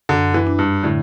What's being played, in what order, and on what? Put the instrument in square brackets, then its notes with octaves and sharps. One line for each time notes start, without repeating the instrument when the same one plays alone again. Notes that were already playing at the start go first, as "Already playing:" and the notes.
[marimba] F#2 [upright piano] D3
[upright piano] E3
[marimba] D4
[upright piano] G2
[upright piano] A2 [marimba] D3